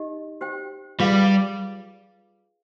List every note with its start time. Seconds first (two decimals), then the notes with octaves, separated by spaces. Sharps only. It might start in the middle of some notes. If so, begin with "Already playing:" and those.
Already playing: D#4 G4 D#5
0.41 G4 C5 G5
0.99 G3 F4 G#4 B4 F5